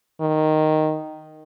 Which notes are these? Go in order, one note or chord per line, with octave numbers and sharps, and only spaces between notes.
D#3